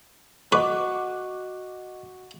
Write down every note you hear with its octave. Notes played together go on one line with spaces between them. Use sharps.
F#4 B4 D#5 C#6 D6